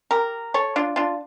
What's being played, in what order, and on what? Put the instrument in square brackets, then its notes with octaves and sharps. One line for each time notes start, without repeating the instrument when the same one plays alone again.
[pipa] G4 A#4
A4 C#5
D4 F4
D4 F4